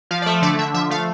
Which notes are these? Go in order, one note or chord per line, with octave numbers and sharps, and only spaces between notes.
F3 F5
D5
A3 E5
D3 D5
D3 E5
F3 E5
A3 F5